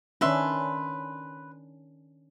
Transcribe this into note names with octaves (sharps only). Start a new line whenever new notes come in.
D#3 C#4 D4 B4 E5 C6